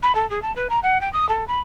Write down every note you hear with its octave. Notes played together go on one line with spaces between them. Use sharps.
B5
A4
G#4
A5
B4
A#5
F#5
G5
D#6
A4
B5